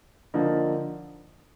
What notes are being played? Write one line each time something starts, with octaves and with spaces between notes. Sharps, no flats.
D3 F3 A#3 D#4